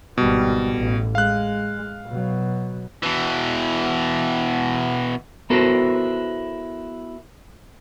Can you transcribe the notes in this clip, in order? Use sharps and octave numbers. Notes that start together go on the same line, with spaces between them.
G#1 B2 G3
A1
G#3 F5 F#6
B2 F#3
B2 E3
B3 E4 F#4 A4 A#4 C5